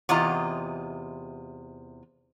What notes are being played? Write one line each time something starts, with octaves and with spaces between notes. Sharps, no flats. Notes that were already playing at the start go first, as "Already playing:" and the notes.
E2 C3 F4 D#5 A#5